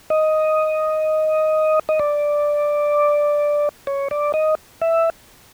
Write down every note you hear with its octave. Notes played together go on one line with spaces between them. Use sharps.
D#5
D#5
D5
C#5
D5
D#5
E5